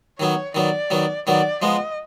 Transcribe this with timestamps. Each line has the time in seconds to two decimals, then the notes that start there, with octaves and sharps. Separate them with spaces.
0.19 D#3 F#3 B3 C#5
0.55 D#3 F#3 B3 D5
0.90 D#3 F#3 B3
1.27 D#3 F#3 B3 D5
1.62 F3 G#3 B3 D#5